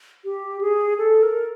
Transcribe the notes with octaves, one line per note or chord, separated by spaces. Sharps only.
G4
G#4
A4
A#4